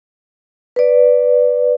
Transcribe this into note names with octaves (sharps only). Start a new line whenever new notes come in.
B4 D5